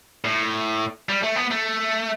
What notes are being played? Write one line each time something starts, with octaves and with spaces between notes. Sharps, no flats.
A2
G3
A3
B3
A3